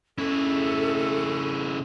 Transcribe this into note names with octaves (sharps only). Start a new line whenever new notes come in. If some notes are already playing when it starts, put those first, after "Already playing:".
C#3 C#4 E4 A4